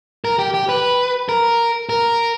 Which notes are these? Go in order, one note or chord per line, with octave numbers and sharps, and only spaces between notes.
A#4
G4
G4
B4
A#4
A#4